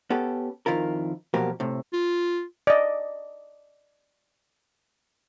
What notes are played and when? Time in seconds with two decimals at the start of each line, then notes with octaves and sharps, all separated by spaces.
0.10 B3 C#4 G4 A4
0.66 F2 D#3 E4 F4 A#4
1.34 B2 F3 F#3 A#3 G4 A#4
1.60 A2 C3
1.93 F4
2.67 D5 D#5